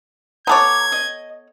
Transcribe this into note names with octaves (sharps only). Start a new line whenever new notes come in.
B3 A4 C#5 A#5 D6 G#6
D#5